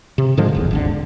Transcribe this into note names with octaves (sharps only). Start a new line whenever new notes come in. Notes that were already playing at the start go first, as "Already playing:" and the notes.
C3
G#2 D3 F3 G#3
D1 G1 E2
D#1 G#1 D3